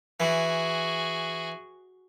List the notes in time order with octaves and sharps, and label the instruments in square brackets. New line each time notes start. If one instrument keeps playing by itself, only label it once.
[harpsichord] E3 [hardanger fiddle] F#4 G#4